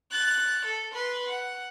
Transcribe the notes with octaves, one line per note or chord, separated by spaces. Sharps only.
F#6 A6
A4
B4 C6
F#5